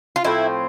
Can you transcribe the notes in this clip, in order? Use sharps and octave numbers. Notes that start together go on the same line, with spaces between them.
F4
A2 F3 C4 E4